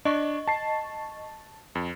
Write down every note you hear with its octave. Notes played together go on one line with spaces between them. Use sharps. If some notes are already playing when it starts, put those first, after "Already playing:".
D4 D#5 C#6
A5 C7
F2